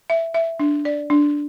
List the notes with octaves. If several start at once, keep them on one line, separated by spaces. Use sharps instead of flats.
E5
E5
D4
D5
D4